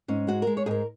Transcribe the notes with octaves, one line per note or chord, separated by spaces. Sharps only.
G#2 C#4
G#3 F#4
G#3 A#4
C#5
G#2 G#4 A#4